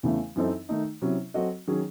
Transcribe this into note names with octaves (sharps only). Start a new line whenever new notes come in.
E2 C#3 E3 A3 C#4
F#2 E3 C4 D#4 A4
D#3 A3 D#4
C3 F#3 C#4 E4
F#3 C4 F#4 A4 D#5
D#3 F#3 C#4 G#4